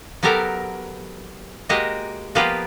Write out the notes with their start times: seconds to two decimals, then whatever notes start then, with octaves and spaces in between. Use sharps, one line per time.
0.23 F#3 B3 G4 A4 A#4
1.69 G#3 A#3 F#4 G4 D#5
2.35 F3 A#3 B3 F4 G4 B4